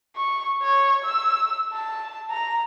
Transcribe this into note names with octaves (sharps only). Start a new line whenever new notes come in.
C#6
C#5
E6
A5
A#5